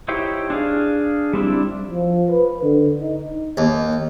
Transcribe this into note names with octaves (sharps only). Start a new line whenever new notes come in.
D#4 E4 G4 C5 C#5
D4 G#4 F5
G3 C4 D4 E4
F3
B4
D3
D#4
D#2